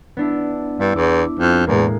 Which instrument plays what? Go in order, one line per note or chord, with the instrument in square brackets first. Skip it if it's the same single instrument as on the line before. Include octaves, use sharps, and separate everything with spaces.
[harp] B3 D4 E4
[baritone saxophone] G2 [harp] E4
[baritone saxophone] E2 [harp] D6
[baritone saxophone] F2
[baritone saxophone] E2 [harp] A2 G#3 A#3